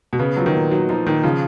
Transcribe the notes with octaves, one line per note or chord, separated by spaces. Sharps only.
B2
C#3 B3
F3 F#3
D#3
A#2
F#3 D#4
F3 D#4
A#2 D#3
C#3 F3